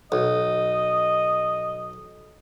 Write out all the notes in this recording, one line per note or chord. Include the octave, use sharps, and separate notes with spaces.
B1 D#5